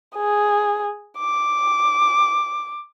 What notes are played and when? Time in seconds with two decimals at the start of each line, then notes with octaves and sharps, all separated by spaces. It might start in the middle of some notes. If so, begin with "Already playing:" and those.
0.16 G#4
1.18 D6